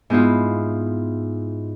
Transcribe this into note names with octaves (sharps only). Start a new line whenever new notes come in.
G#2 B3 E4 F4